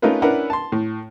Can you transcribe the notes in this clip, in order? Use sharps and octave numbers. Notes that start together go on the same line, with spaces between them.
A3 C#4 D#4 F4 A#4 B4
C#4 D4 E4 A#4 B4 F#5
A5 C6
A2